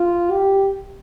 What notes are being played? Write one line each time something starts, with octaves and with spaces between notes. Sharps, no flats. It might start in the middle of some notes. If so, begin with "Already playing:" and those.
Already playing: F4
G4